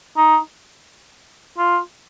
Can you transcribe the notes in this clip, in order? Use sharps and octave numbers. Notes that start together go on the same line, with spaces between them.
D#4
F4